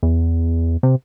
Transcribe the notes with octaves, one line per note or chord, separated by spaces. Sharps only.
E2
C3